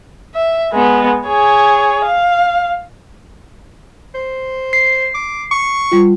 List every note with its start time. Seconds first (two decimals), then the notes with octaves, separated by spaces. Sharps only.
0.34 E5
0.72 G#3 B3
1.27 G#4 C#5
2.05 F5
4.15 C5
4.73 C7
5.14 D6
5.51 C#6
5.92 G3 F4